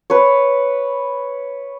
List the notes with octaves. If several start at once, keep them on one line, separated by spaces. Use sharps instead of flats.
B4 C#5